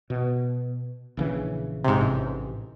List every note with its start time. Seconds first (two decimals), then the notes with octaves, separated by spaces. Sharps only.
0.10 B2
1.17 A#1 C#3 E3
1.84 G#2 C3
2.01 A1